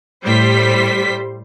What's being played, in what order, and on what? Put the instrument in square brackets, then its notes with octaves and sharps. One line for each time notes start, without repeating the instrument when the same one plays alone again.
[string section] A2 G3 C5 B6